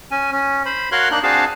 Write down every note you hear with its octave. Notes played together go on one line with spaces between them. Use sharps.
C#4 G#5
C#4
C5 B5
F#4 A#4 C#5 F5 C6 F#6
A#3 D4 D#4 F#6
C4 D4 F#4 G#4 F5 A5